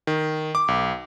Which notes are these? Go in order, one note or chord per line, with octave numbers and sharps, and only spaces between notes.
D#3
D6
B1